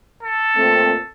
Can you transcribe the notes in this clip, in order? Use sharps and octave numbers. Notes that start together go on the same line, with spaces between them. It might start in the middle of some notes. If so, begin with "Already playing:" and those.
A4
A#2 A3 C4